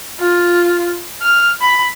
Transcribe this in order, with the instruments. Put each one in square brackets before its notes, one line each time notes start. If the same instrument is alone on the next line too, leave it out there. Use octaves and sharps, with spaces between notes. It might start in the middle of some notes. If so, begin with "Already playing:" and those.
[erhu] F4
F6
B5